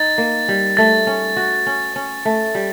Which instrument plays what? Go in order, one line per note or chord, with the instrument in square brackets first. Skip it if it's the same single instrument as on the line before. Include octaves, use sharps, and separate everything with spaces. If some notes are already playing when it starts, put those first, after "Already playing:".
Already playing: [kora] D#4 [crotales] A6
[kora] A#3
G3
[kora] A3 [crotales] A6
[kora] C#4
F#4
C#4
C#4
A3
G3